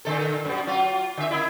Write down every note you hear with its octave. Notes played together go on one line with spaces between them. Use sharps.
A#2 D3 A4
F#2 B2
F#3 F4
D3 E5
A#3 D#4 E4